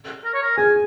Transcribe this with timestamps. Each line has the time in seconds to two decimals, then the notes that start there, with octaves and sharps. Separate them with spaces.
0.25 A#4
0.34 C#5
0.43 A#4
0.57 G#4 G#5